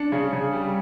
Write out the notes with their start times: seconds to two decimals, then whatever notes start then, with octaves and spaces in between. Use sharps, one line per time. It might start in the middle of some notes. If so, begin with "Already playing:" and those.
Already playing: D4 C#7
0.12 C#3
0.33 C#3
0.53 G3